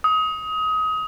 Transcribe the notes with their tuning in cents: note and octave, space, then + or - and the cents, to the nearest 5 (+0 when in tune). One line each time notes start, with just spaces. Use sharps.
D#6 +25